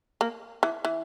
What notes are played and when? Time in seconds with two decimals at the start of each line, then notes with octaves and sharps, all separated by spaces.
0.21 A#3
0.63 E3
0.85 E3